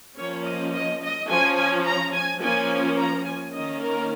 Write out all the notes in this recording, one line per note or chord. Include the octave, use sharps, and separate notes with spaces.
F3 A#3 C#4 C#5
D#5
D#5
D#5
F3 C#4 G#5
G#5
A#5
G#5
F3 A#3 C#4 G#5
A#5
G#5
D#3 A#3 C#4 D#5
A#4